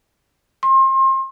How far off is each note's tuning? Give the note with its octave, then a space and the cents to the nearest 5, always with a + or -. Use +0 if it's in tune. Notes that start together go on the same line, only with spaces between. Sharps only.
C6 +35